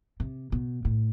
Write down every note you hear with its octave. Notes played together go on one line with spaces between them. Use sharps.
C3
B2
A2